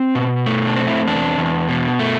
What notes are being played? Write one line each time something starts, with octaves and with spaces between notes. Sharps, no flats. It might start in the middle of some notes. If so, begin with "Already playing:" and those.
Already playing: C4
B2
A3
D4
C4
E4
E2 D4
E2
B2
A3